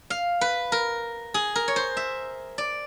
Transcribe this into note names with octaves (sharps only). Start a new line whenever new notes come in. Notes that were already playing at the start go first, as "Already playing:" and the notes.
F5
B4
A#4
G#4
A#4
C#5
C5
E5
D5